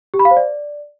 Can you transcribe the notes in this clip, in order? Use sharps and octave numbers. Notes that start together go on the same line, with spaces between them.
G4
B5
F5
C5
D5